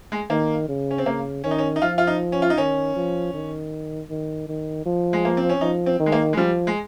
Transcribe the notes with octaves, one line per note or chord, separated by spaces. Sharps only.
G#3
D#3 A#3
C#3
C#4
C4
C#3 A#3
D#3 C#4
D#4
C#4
D#4
F3 F4
F4
D#4
C#4
F4
D#4
D#3 C#4
F3
D#3
D#3
D#3
F3
G#3
A#3
C4
C#4
F3 D#4
C4
D#3
G#3
A#3
G#3
F3 G3
G#3